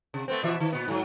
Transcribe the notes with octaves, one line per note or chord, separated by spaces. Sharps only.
C3
A3 B3 C4
B2 E3 E5
D#3
A#2 B3
G#2 F#3